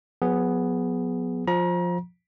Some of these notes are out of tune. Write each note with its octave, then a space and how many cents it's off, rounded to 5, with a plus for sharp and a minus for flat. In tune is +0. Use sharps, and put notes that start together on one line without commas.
F#3 -45 B3 +0 G#4 -5
F3 +15 A#5 +35